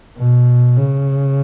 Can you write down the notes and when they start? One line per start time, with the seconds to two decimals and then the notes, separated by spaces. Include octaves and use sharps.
0.17 B2
0.76 C#3